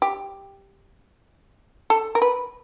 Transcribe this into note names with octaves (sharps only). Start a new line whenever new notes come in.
G4
A4
A#4
B4